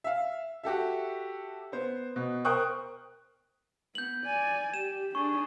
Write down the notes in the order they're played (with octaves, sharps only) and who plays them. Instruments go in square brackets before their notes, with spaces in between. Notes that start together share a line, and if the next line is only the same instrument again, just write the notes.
[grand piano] E5 F5
F#4 G4 A4 E5
B3 C5
B2
A#4 C5 G5 C#6 D#6 F#6
[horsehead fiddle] B3 [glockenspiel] G6 F#7
[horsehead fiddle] D5 G#5
[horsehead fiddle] G4 [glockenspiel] E7
[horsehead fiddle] D4 G#4 [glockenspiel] C#6